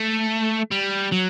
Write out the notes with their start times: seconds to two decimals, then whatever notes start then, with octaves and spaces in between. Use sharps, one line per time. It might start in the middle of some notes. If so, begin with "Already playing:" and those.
Already playing: A3
0.71 G3
1.12 F#3